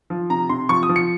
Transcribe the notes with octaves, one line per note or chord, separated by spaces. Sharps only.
F3
C3 A#5
C3 C6
F3 C#6
D#6
F3
C#7